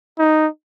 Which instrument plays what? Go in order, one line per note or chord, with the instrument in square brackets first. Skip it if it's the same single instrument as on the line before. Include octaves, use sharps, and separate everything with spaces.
[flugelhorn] D#4